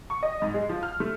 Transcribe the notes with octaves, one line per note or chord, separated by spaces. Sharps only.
C#6
D#5
G#2
G#3
F3
F6
A3